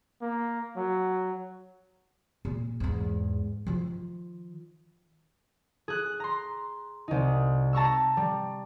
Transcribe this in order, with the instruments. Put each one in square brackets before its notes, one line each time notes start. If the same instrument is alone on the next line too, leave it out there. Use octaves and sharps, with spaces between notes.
[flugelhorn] A#3
F#3
[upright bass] A#2
E2 G#2
D#3 F3
[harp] G#4 F#6
A#5 C6
C2 D#4
A5 A#5 C#6 E6
G3